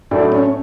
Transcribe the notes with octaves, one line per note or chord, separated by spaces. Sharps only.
A2 F#3 A3 D4 E4 A4
C#4